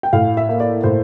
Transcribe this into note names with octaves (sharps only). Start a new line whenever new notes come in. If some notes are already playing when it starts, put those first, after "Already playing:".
G5
A2 F5
E5
A#3
D5
A2 C5